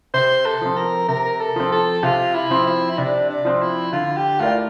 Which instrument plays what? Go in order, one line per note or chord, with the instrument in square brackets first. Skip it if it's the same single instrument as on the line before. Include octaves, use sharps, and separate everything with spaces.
[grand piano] C3 [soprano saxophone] C5
[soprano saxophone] A4
[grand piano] F3 C4
[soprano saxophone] A#4
[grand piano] C3 [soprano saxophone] A#4
[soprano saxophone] A4
[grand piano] F3 C4
[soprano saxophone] A4
[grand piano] C3 [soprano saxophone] F4
[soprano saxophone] E4
[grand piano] F3 C4
[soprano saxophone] E4
E4
[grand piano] C3 [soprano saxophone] D4
[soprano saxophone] D4
[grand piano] F3 C4
[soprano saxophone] E4
[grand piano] D3 [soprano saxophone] F4
[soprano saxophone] G4
[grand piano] A3 E4 A#4 D5 [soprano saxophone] F4